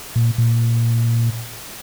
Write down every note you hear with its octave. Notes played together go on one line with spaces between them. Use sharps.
A#2
A#2